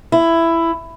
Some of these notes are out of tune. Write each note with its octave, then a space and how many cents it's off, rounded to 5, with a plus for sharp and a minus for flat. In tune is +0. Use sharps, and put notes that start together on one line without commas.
E4 +10